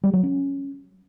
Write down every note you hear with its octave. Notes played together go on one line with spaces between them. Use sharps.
G3
F#3
C#4